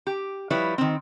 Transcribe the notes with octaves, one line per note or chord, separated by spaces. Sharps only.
G4
F3 G3 E4 B4 C#5
D#3 C4